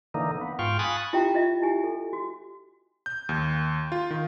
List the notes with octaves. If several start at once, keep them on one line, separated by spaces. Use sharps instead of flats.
D3 E3 A#3 D#4
B3
G#2 F4 F5 G5 C#6
G#5 B5 C#6 D#6 F#6 A6
E4 F4 G4 E5 G5 A#5
F4 D#5 E5
E4 G4 G#5
A4
F#4
G6
D#2
F4
D#3